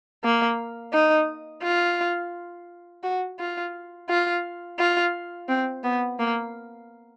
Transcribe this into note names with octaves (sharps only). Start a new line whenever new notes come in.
A#3
D#4
F4
F#4
F4
F4
F4
C4
B3
A#3